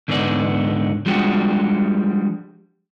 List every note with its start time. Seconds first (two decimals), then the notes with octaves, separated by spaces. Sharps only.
0.08 D2 G#2 D3 B3 D#4 D5
1.06 F3 G3 G#3 D4 F#4 G4